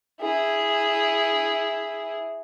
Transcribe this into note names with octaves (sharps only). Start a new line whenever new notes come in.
E4 G#4